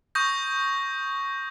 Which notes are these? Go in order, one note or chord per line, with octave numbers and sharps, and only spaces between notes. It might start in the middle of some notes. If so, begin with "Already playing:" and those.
C#6 D#6 G6 A#6